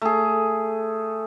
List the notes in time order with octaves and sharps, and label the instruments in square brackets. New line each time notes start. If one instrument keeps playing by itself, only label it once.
[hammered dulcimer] A3 G#4